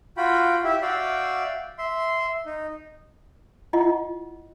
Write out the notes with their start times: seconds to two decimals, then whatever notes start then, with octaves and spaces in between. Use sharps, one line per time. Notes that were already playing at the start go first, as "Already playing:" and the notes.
0.17 F4 F#4 G5 B5
0.64 E4 G4 E5
0.82 F#4 D5 E5 F5 G5
1.78 E5 C6
2.46 D#4
3.73 E4 F4 D#5 F#5